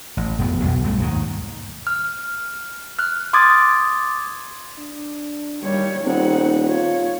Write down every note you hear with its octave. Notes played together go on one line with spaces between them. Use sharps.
A1
E1 F2 E3 B3
B1 B2
B1 G2 A3
D#2 G#2 D#3
F6
F6 F#6
C6 D6 D#6 G#6 A6
D4
D#2 G3 C#5
D#1 C4 D#4 F#5
F4 C#5